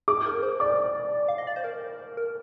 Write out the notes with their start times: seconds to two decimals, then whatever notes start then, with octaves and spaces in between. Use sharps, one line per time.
0.08 G#4 D6
0.26 A#4
0.43 C5
0.60 D5 D6
1.28 F5
1.38 D#5
1.47 D5
1.56 C5
1.64 A#4
2.17 A#4